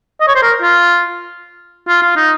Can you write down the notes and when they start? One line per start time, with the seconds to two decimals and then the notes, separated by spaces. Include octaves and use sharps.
0.20 D#5
0.28 C#5
0.35 C5
0.42 A#4
0.62 F4
1.88 F4
2.02 F4
2.16 D#4